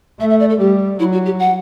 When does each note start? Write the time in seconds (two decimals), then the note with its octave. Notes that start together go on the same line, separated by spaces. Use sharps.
0.20 A3 E5
0.30 E5
0.40 D5
0.50 A4
0.60 G3 G4
0.99 F#3 E4
1.13 F#4
1.26 G4
1.39 F#5